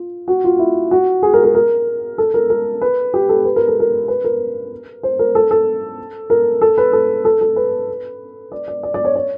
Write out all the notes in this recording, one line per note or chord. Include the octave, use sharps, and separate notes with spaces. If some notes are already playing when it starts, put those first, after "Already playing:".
Already playing: F4
F#4
F4
E4
F#4
G#4
A#4
A#4
A#4
A4
A#4
A#4
B4
G4
A4
B4
A#4
A4
A#4
B4
A#4
C5
A#4
A4
A4
A#4
A4
B4
A4
A4
A4
B4
D5
D5
D5
D5
C#5
C#5